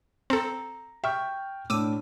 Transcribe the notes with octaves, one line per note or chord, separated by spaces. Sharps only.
C4 A4 A#5
E5 G5 C#6 F6
A2 D4 D6 E6 D#7